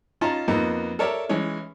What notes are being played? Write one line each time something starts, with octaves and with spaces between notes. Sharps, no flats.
C#4 D#4 F4 A5 A#5
F2 A#3 B3 D#4
A4 A#4 C#5 D5 E5
E3 G#3 C#4 C#5